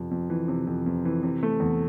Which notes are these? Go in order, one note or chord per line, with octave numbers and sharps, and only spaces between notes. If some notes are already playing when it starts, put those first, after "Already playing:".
Already playing: F2 C3
F2
E3
C3
F2
F2
E3
C3
A3
E2